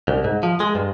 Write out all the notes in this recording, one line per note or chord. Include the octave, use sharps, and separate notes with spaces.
C2
G#2
F3
G#3
G2